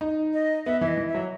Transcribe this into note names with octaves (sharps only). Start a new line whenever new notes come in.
D#4
D#5
B3 E5
E3 E5
D#5
E3
E5
F#3